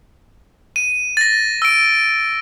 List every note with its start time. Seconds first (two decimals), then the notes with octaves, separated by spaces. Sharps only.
0.76 D#7
1.17 A6 A#6
1.62 E6 D7